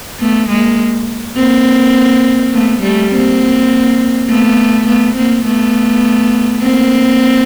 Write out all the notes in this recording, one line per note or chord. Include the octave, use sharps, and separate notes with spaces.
A3 B3
G#3 A#3
A#3 C4
A3 B3
G3 A3
A#3 C4
A3 B3
A3 B3
A#3 C4
A3 B3
A#3 C4